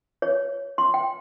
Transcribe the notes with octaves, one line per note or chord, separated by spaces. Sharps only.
C#5
C6
G5